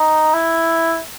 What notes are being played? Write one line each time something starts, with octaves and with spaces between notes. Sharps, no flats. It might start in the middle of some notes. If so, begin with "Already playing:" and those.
Already playing: D#4
E4